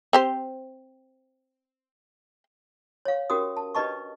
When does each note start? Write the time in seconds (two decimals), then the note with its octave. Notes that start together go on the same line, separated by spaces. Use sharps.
0.13 C4 G4 C5
3.05 C#5 F5
3.30 C#4 F#4 G4 A#4 D#6
3.57 A5
3.75 D4 G4 B4 D#5 A5 C#6